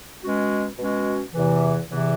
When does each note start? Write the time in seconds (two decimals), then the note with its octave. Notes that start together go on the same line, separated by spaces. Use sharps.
0.23 B2 G#3 C#4 F#4
0.78 B2 G#3 C#4 F#4
1.34 E2 C3 E3
1.89 E2 C3 E3